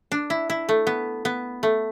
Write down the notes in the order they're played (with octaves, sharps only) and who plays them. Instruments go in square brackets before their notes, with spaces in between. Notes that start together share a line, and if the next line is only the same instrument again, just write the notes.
[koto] D4
E4
E4
A3
B3
B3
A3